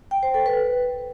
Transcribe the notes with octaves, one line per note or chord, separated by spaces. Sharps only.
G5
C5
A4
B4